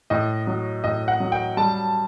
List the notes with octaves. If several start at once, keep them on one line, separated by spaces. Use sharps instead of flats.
A2 D#5
F#3
A2 D#5
F#5
F#3
G5
G3 A5